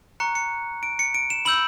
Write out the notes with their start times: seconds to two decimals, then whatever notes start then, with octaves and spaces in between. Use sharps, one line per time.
0.20 A#5 C#6 F#6 C#7
0.35 C#7
0.83 D7
0.99 C#7
1.14 D7
1.30 E7
1.45 B5 E6 G6 F#7